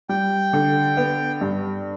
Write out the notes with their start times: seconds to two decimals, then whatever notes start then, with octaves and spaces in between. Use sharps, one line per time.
0.09 G3 G5
0.53 D3
0.97 B3
1.41 G2